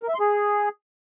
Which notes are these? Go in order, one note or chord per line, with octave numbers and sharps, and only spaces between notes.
A#4
E5
C6
G#4